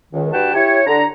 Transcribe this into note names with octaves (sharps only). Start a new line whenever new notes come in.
C#2 D#3
G2 F#4 B4 G5 A5
E4 G4 C#5
D3 A#5